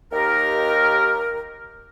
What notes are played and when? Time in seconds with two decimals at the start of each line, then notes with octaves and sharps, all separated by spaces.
0.12 D#2 D#3 G4 A#4